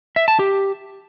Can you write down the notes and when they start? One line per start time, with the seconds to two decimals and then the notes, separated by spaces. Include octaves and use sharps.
0.16 E5
0.28 A5
0.39 G4